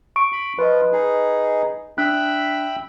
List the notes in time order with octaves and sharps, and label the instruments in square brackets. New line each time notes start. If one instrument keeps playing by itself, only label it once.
[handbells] C#6 D7
[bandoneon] B5
[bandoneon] F3 F4 [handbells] B4 D#5
[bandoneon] D#4 G#4
[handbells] D4 F#6 [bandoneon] E5 G5 B5